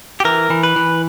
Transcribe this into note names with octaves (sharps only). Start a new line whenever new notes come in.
G4
E3 A#4
E3
B4
E3